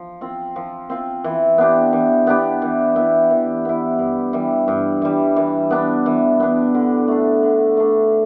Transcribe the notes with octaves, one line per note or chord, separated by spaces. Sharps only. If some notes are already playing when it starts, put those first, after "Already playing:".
Already playing: F3
C4 F4
F3
C4 F4
E3
B3 D4 G4
E3
B3 D4 G4
E3
B3 E4
E3
B3 E4
G2
E3 G3
G2
E3 G3
E3
B3 D4
E3
B3 D4
D3
A3 D4
D3
A3 D4